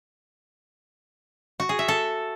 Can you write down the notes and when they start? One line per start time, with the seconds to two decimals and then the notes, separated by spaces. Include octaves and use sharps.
1.60 F#4
1.69 G#4
1.79 E5
1.88 A4